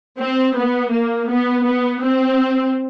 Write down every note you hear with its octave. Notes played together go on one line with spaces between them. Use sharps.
C4
B3
A#3
B3
B3
C4